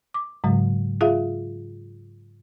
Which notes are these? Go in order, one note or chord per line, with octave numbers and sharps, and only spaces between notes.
D6
G#2 C#3 F#3 G#3
F4 G#4 E5 F5